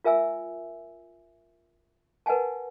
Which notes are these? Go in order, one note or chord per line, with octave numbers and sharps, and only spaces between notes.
F4 A#4 E5 G#5 E6
A#4 B4 D#5 F#5 G#5 A5